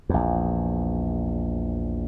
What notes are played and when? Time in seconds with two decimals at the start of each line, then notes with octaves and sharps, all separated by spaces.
0.09 A#1 E2